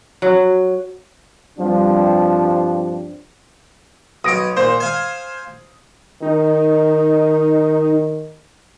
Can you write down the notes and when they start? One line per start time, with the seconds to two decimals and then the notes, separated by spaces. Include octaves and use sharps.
0.22 F#3
1.58 G2 F3 G3 C4 D4
4.24 B1 C#5 D#6 A#6 D7
4.57 A#2 C5
4.80 F5 G#5
6.22 D#3 D#4